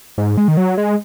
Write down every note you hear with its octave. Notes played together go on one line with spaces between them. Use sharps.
G#2
G#3
D#3
F#3
G#3